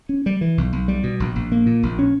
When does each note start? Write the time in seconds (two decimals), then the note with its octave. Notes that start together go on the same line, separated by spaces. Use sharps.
0.09 C#4
0.26 G3
0.41 E3
0.58 B1
0.73 B1
0.88 G3
1.03 B2
1.20 A#1
1.36 A#1
1.52 A#3
1.66 A#2
1.83 A#1
1.99 C#4